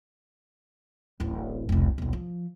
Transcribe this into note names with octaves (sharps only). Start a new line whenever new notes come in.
D1 A1
E1 C2
D#1 B1
F3